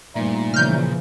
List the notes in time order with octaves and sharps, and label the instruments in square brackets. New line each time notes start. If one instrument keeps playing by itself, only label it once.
[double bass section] G2 F3 [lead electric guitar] A#2 [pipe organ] G3 A3 D#4
[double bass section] C#3 E3 F3 [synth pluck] F6 G6